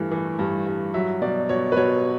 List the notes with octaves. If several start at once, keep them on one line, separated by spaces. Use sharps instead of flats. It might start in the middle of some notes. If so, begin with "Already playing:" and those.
Already playing: G2 E3 A3
E3
G2
G2
F#3 E5
B2 D5
B2 C#5
B4
B2 C#5